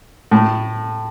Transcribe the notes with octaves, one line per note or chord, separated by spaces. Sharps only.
A2